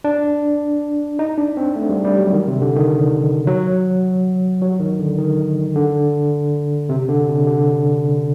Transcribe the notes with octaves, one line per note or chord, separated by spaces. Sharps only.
D4
D#4
D4
C4
A3
G3
G3
F#3
D#3
C3
D3
D#3
F#3
F#3
D#3
D3
D#3
D3
C3
D3
C3
D3